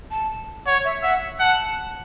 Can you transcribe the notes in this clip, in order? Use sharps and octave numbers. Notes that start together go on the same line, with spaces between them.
A5
C#5 F#5
E5
E5 F#5
F#5 A5